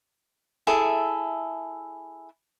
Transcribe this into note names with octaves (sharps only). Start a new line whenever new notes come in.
E4 G#4 A4 E5